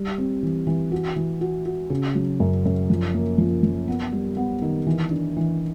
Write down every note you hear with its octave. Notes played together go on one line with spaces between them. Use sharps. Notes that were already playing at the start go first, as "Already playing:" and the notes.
Already playing: G3
C4
E3
E3
F#4
E3
F#4
F#4
C#3
F#3
F#2
F#2
F3
A#3
F3
F3
B3
G3
B3
D#3
E3
D4
E3